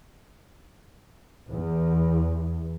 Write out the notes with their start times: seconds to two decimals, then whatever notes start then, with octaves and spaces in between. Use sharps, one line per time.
1.50 E2